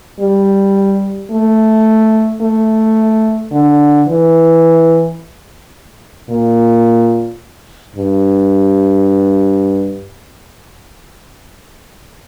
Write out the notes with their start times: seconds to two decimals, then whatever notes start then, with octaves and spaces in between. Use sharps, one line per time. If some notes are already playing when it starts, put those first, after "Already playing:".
0.20 G3
1.31 A3
2.42 A3
3.52 D3
4.08 E3
6.29 A#2
7.95 G2